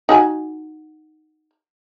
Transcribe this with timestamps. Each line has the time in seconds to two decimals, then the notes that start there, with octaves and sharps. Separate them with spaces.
0.09 D#4 F#4 G#5